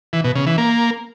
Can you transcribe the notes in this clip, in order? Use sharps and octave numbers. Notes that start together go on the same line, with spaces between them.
E3
B2
C#3
E3
A#3